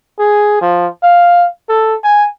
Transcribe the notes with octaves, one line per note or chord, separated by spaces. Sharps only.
G#4
F3
F5
A4
G#5